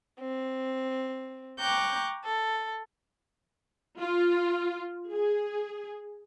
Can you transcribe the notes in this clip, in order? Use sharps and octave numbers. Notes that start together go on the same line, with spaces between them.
C4
G5 A#5 C#6 D6 F#6 G6
A4
F4
G#4